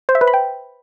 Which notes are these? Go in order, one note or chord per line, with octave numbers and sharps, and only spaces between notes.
C5
E5
B4
B5
G5